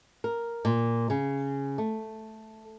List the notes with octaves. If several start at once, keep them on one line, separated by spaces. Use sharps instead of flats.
A#4
A#2
C#3
A3